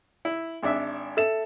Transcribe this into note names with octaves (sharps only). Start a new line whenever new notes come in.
E4
G#1 D4 E5
A4 E5 E7